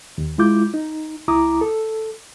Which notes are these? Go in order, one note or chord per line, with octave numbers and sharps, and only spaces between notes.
D#2
G#3 E4 F4 D6 G6
D#4
C#2 E4 A#5 D6 D#6
A4